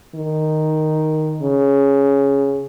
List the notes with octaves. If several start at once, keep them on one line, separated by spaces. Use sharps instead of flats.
D#3
C#3